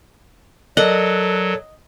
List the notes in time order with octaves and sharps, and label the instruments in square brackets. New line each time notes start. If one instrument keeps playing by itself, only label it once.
[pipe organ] F#3 [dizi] A4 [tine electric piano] A#4 D5 F#6 [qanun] D#5 F#5